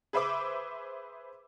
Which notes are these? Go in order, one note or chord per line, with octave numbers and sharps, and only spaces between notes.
G#4 B4 C5 E5 B5 D6